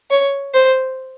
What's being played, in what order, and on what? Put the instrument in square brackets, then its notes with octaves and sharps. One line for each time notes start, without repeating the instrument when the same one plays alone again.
[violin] C#5
C5